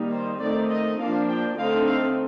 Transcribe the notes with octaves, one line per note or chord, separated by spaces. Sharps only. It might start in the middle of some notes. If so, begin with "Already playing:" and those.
Already playing: D#3 G3 A#3 D#4
C5
D#3 A3 C4 D#4 D5
D#5
F3 A#3 D4 F5
G5
D3 A3 C4 D#4 F5
F5